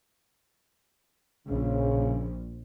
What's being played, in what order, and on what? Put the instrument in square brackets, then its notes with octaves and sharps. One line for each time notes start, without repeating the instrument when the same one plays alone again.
[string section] A#1 [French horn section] C#3